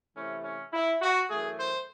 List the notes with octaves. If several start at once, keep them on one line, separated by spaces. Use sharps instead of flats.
C3 E3 A3 C#4
C#4
E4
F#4
F#2 E3 A3 G#4
C5